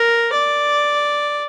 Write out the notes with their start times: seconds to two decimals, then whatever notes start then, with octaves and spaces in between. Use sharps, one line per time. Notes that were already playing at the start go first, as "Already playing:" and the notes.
Already playing: A#4
0.33 D5